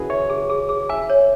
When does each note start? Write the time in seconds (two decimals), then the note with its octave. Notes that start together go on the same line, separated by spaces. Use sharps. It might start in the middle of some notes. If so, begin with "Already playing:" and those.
Already playing: C#4 E4 F#4 G#4 B4
0.10 C#5 E5
0.30 G#4
0.50 G#4
0.69 G#4
0.89 E5 G#5
1.10 C#5